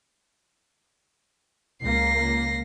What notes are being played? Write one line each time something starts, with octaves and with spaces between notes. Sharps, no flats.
C#2 A#3 A#6 C7